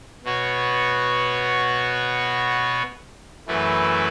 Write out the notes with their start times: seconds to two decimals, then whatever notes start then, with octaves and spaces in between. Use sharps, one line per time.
0.24 B2 B3 F#4 C#5
3.47 F#2 E3 A3 E4 B4